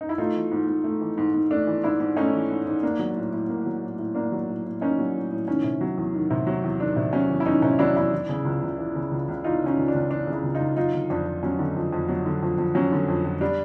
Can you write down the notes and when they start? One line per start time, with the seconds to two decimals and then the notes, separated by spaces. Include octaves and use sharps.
0.01 D#4
0.09 E4
0.18 A3 D#4 F4
0.35 E3
0.51 G#2
0.67 G#2
0.84 A3
1.01 E3
1.18 G#2
1.34 G#2
1.50 A3 D4
1.67 E3
1.83 G#2 D4 E4
2.00 G#2
2.16 A3 C#4 D#4
2.34 E3
2.50 G#2
2.67 G#2
2.83 A#3 D4
2.99 F#3
3.16 A2
3.32 A2
3.49 A#3
3.66 F#3
3.82 A2
3.98 A2
4.15 A#3 D4
4.32 F#3
4.48 A2
4.65 A2
4.81 A#3 C#4 D#4
4.98 F#3
5.14 A2
5.31 A2
5.47 D#3 C#4
5.64 C3
5.81 F#3
5.98 E2
6.14 D#3
6.30 C3
6.47 F#3
6.64 E2
6.80 D#3 D4
6.96 C3
7.13 F#3 C#4
7.30 E2
7.40 E4
7.46 D#3 C#4 D#4
7.62 C3 C#4 D#4
7.79 F#3 D4 E4
7.95 E2 D4 E4
8.13 E3
8.29 C#3
8.45 C#2
8.62 C#2
8.78 E3
8.95 C#3
9.11 C#2
9.28 C#2
9.44 E3 D#4 F4
9.61 C#3
9.66 C#4 D#4
9.77 C#2
9.88 D4
9.94 C#2
10.10 E3 D4
10.27 C#3
10.32 D4 E4
10.43 C#2
10.54 D#4 F4
10.60 C#2
10.77 F#3 D#4 F4
10.93 D3
11.10 F2 D4
11.26 F2
11.43 F#3 C#4
11.59 D3
11.76 F2
11.93 F2
12.09 F#3
12.26 D3
12.43 F2
12.58 F2
12.75 F#3 C#4
12.92 D3
13.08 F2
13.25 F2
13.41 G3 D4